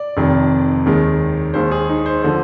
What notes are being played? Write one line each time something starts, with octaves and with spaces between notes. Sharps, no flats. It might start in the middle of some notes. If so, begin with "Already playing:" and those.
Already playing: D5
F1 F2 D#3
D#2 D#3 G#3
D#2 D#3 G#3 C5
G#4
D#4
C5
D3 F3 C5